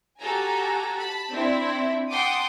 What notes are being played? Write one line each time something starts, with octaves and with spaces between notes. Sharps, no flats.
F#4 G4 A4 G#5 A#5
A5 B5
C4 D4 E4
F#5 G5 A5 C6 D6 D#6